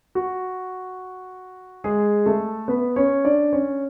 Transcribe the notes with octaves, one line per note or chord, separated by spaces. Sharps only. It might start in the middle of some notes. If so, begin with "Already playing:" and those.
F#4
G#3 G#4
A3 A4
B3 B4
C#4 C#5
D4 D5
C#4 C#5